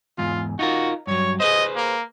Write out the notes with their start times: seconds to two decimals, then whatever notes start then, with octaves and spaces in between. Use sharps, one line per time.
0.18 E2 G#2 F4
0.59 D#4 F4 F#4 A#4
1.07 G2 F#3 C#5
1.40 G#4 B4 C5 D#5
1.76 A#3